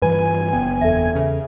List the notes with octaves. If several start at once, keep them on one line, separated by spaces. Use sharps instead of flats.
G2 E3 F3 B4 G#5
F#1 B3 G5
E2 A4 E5
C#3 B4 C#5 E5